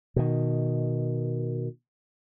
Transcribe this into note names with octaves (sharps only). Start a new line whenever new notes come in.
B2 D#3